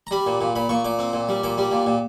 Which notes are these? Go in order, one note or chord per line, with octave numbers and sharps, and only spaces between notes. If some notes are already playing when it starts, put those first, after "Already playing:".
A#5
G3 B5
A#2
A#2
A#2 B5
A#2 C#6
A#2 D6
C4
A#2
G3
A#2 D6
G3
A#2
A#2